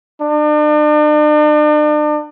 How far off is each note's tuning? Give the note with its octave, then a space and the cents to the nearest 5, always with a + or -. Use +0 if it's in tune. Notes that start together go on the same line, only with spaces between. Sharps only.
D4 +40